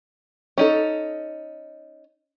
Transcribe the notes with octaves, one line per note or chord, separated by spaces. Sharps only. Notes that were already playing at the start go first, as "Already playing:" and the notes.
C#4 D#4 A4